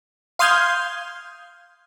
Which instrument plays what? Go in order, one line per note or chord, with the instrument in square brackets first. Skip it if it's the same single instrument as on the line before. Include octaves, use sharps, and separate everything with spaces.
[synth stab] F5 C6 D#6 F6 G6 G#6